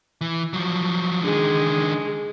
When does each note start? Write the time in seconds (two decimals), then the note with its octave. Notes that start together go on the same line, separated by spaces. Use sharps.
0.21 E3
0.53 F3 F#3
1.24 D3 D#3 G#3 G#4